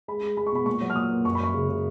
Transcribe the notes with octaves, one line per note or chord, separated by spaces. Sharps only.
G#3 B5
G#3
G#3 B5
C#6
B2 B5
A#2 C#6
F#3
F6
A#2 D#6
A#3
F#2 C#6
B5
F#2 C#6
C#3
C#3